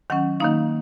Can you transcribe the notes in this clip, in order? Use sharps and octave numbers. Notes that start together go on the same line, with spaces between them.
D#3 F#3 C#4 F#5
D#3 A#3 D#4 F5